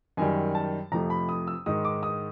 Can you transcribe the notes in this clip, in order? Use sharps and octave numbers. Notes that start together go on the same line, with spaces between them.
F#2 D#3 G3 G#5
A5
F2 C3 F3 A3 A#5
B5
D#6
E6
G#2 D#3 G#3 D#6
D6
D#6